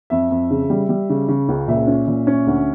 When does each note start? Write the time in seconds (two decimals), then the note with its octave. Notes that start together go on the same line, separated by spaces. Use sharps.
0.10 F2 E5
0.31 F2
0.50 C#3
0.70 G3
0.89 G3
1.10 C#3
1.28 C#3
1.48 C#2
1.68 A#2 E5
1.87 C#4
2.07 A#2
2.27 C#4
2.47 D2